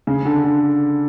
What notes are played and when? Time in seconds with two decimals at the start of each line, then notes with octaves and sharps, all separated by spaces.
0.07 C#3
0.25 D3
0.44 D3